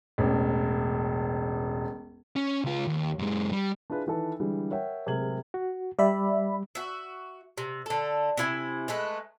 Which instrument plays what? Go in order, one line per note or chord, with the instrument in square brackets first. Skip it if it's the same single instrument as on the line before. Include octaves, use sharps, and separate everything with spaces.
[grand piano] E1 A1
[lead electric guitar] C#4
C#2 F4
D#2
F#2 G#3
G3
[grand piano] D4 E4 F4 G#4 B4
D#3 E3 A4 B4
D3 E3 G3 G#3
A#4 C#5 E5 F#5 G5
D1 C3 G#3 A#4 G#6 F#7
[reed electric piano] F#4
[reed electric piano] G3 [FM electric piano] D5 E5 B5
[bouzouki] F#4 E5
C3
D3 A4
C3 E4 G#5
G#3 A3 B4